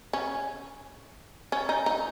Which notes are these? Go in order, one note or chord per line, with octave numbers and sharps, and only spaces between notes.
C#4
C#4
D#4
D#4